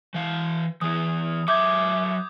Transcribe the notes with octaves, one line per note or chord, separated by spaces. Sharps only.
E3 F5
E3 B3 D#6
F#3 E5 D6 G6 G#6